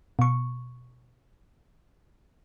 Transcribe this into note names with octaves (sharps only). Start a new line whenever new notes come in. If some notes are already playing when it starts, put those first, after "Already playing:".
B2 C#6